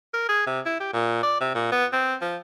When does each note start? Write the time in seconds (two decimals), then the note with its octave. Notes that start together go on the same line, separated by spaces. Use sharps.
0.14 A#4
0.29 G#4
0.47 C3
0.66 E4
0.80 G4
0.93 A#2
1.23 D5
1.41 C3
1.55 A#2
1.72 B3
1.93 C4
2.22 F3